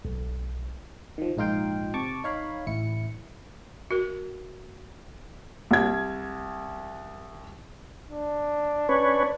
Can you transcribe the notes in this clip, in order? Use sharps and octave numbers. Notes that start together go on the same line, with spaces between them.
B1
D#3 F3
A#1 G#2 D#4 F4 F5 G5
C3 A5 C#6 D6
D#4 C#5 F5 B5
A1 E4 C#7
F#4 A#4
C2 G#6
D4
C#4 D4 B4 C#5